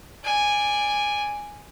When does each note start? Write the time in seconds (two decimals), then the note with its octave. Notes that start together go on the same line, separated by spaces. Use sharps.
0.24 D5 G#5